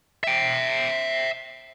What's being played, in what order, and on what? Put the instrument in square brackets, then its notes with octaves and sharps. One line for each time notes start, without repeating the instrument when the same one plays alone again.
[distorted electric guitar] E5 G5